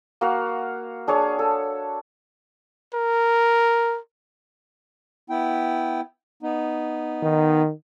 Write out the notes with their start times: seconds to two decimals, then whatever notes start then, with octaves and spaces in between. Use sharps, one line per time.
0.21 A#3 F#4 F5 F#5
1.08 D4 G#4 C#5
1.39 A4
2.95 A#4
5.30 B3 E4 G5
6.43 B3 D#4
7.23 D#3